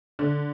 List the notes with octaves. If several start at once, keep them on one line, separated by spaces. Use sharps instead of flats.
D3